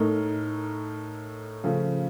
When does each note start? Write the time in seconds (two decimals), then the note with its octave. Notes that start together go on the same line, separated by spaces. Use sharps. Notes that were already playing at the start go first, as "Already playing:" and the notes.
Already playing: A2 A3 D#4 A#4
1.64 C#3 F3 A3